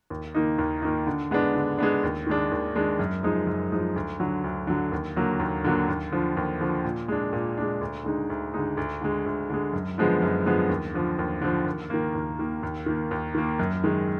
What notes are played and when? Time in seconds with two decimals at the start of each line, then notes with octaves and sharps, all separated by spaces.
0.10 D#2
0.35 D#3 A#3 D#4
0.58 D#2
0.82 D#3 A#3 D#4
1.07 D3
1.31 G#3 B3 D4
1.55 D3
1.79 G#3 B3 D4
2.03 D#2
2.27 D#3 G#3 D4
2.52 D#2
2.75 D#3 G#3 D4
2.99 F#2
3.23 F3 G#3 D#4
3.47 F#2
3.72 F3 G#3 D#4
3.96 D2
4.20 D3 F#3
4.44 D2
4.67 D3 F#3
4.92 D#2
5.16 D3 F#3 A#3
5.39 D#2
5.64 D3 F#3 A#3
5.88 D#2
6.12 D3 F3
6.37 D#2
6.61 D3 F3
6.85 A#2
7.08 G#3 D4
7.33 A#2
7.57 G#3 D4
7.81 D2
8.04 D3 G#3 D#4
8.30 D2
8.54 D3 G#3 D#4
8.77 D2
9.01 D3 G#3
9.26 D2
9.50 D3 G#3
9.73 F#2
9.98 D3 F3 G#3 B3
10.22 F#2
10.46 D3 F3 G#3 B3
10.69 D#2
10.94 D3 F3
11.19 D#2
11.42 D3 F3
11.66 D#2
11.90 D#3 A#3
12.15 D#2
12.39 D#3 A#3
12.63 D#2
12.86 D#3 A#3
13.11 D#2
13.35 D#3 A#3
13.59 F#2
13.84 D#3 G#3